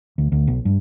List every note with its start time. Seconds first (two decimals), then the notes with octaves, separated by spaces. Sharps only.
0.18 D2
0.32 D2
0.47 B1
0.65 G2